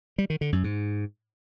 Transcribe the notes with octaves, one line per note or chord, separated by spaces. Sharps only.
G3
D#3
D3
F#2
G#2